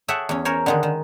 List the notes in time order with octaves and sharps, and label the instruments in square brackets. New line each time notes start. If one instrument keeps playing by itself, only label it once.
[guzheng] G#4 A4 C#5 E5 F#5 G5
E2 C#4
C#4 A#4 C5 C#5 G#5
D3 D#3 G#3
D#3